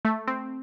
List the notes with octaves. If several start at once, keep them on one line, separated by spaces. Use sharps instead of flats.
A3
C4